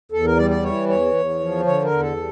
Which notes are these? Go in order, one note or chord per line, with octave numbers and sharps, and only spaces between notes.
E2 A4
A#4
G3 D5
D5
E3 C#5
E2 C#5
E2
F3
D3 C#5
A#4
E2
A4
G3